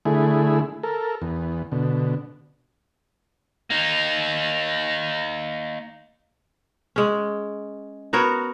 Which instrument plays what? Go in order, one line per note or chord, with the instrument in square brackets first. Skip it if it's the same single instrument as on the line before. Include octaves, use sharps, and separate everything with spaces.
[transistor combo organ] D3 A3 E4 G#4
A4 A#4
E2
B2 D3
[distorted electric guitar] A#3 D#4
[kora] G#3 C#4
B3 F#4 A#4 C#5